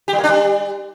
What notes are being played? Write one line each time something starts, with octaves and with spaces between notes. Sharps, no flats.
G4
G3
A#3
D4
G3